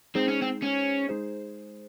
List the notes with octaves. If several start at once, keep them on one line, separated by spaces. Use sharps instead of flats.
G#3 C4 D#4 G#4 C5
C#4
C4
C#4
G#3 D#4 G#4 C5